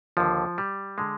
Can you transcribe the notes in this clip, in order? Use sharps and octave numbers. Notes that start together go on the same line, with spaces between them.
D#2 D3 F3
G3
D3 G#3